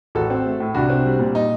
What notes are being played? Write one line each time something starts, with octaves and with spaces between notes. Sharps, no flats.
A1 F#4 A4
C4
A3
A2
C2 D4 F#4
C4
G3
A#2
D#4